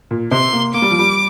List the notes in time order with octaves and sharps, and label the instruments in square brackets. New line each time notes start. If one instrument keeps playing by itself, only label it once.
[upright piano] A#2
[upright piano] C3 [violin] C6
[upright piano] A#3
[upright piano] A#3 [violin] D6
[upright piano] G3
F3
G3